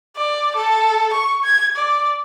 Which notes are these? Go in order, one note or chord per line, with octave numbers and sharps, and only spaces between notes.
D5
A4
C#6
G#6
D5